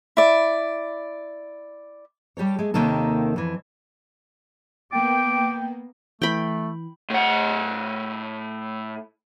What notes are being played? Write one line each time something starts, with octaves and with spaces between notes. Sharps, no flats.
E4 D5
G3 G4 A4 C#5
G#3 A3
D#2 C3 D#3 A#3 A4
F2 E3
A#3 B3 G5 D6
E3 A3 G5 B5
A2 F#5